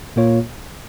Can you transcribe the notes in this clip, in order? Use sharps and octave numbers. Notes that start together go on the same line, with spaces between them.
A#2 A#3 F4 C#5